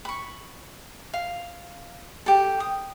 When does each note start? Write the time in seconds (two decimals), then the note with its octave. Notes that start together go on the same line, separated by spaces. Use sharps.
0.05 B5 C#6
1.13 F5
2.26 G4 A4
2.60 D#6